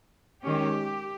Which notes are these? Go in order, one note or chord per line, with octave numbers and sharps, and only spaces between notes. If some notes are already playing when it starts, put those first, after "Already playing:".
D#3 G#3 C#4 G4